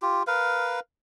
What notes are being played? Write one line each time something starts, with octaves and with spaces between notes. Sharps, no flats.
F4 G4
A#4 B4 F5